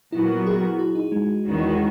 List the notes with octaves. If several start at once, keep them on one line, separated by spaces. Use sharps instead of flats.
A#2 F#3 B3 E4 F#4 A#4
G#4
F#4
D#4
G#3
E2 D#3 G#3 C#4 F#4